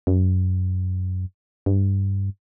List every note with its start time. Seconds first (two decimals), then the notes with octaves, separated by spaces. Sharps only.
0.07 F#2
1.66 G2